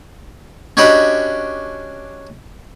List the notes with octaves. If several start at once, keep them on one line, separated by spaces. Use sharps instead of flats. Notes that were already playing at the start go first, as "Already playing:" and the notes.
C#4 D4 F#4 G4 D#5 B5